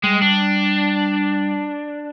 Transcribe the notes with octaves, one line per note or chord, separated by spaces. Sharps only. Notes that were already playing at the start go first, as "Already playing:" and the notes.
G3 G#3
D4